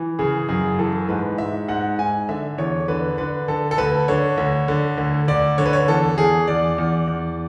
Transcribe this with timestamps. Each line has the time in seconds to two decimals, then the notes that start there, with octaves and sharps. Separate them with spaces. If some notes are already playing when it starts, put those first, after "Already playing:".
Already playing: E3
0.19 C#3 G#4
0.49 F#2 G#4
0.78 E3 A4
1.09 G#2 B4
1.38 G#2 E5
1.68 G#2 F#5
1.98 G#2 G#5
2.29 D3 E5
2.58 E2 C#5
2.88 D3 B4
3.18 D3 B4
3.48 D3 A4
3.71 A4
3.78 D2 B4
4.08 D3 C#5
4.38 D2
4.68 D3
4.98 D2
5.28 D2 D5
5.58 D3 C#5
5.66 B4
5.73 C#5
5.88 E2 A4
6.18 E2 G#4
6.48 E2 D5
6.78 E2
7.08 E2